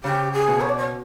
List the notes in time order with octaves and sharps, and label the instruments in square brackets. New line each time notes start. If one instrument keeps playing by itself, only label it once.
[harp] C#3 [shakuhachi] G4
[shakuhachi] G#4
[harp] B2
[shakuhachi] C#5
D5
C#5